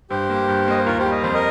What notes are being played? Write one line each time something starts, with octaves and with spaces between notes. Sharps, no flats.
G2 G4 C5
A#3
G2
A#3 D#5
C5
D#2 F4 A#4
G4 C5
G3
D#5
F2 C5
A#4 D#5